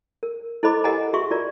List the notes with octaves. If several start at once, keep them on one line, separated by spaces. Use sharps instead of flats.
A#4
E4 A4 C5 D#5 B5 D6
G4 A#4 D#5 F#5 G#5 A#5
F#4 G#4 E5 C6 C#6
F4 A#4 D5 A#5